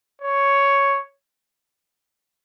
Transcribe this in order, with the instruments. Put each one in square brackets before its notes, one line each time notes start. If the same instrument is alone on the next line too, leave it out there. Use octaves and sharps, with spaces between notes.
[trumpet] C#5